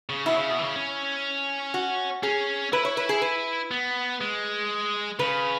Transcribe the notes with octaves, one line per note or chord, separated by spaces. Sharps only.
C#3
B2 E4
C#3
B2
E3
C#3
C#4
F#4
C#4 G#4
E4 B4
C#5
B4
G#4
B4
B3
G#3
C#3 B4